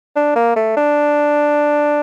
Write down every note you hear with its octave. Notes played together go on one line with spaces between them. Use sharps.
D4
A#3
A3
D4